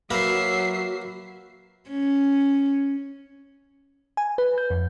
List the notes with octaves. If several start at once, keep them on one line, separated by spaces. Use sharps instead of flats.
F#3 A#3 F#4 A#4 B4 E5 C7
C#4
G#5
B4
G6
F2